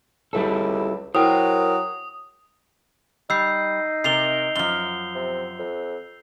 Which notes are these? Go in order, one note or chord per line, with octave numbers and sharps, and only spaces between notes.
C#2 G3 E4 A4
F#3 E4 A#4 C5 G5 D#6
G3 D#4 E6 G6 C7
C3 A#4 C7 F7 G7
F#2 F3 G7
C3
F2